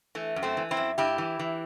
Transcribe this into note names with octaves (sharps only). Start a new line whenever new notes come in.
E3 A3
F#2
A3 C4
E3
C4 E4
F#2
G2 E4 G4
E3
E3